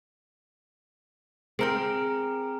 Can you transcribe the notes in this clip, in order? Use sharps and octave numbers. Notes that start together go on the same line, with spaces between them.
C4 G#4 A#4 G5 A#5 F6